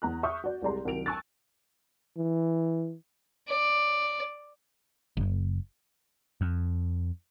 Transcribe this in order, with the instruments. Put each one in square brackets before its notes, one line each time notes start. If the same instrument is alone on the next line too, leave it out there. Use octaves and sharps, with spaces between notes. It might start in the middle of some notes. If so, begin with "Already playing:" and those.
[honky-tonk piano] E2 A#5 F#6
E5 C#6 D#6 F6 G6
F#4 D5
C2 G3 G#3 D5 A#5 C6
C2 D#3 F#3 D7 F7
G#5 A5 C#6 E6 F#6 A6
[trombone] E3
[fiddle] D5
[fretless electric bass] F#1
[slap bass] F2